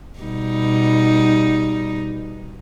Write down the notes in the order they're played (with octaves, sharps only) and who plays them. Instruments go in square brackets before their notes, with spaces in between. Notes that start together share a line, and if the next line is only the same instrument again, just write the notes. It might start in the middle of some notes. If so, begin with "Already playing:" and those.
[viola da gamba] B2 G3 D#4